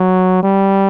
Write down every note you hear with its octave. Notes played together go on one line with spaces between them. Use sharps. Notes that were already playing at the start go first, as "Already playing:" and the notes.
Already playing: F#3
G3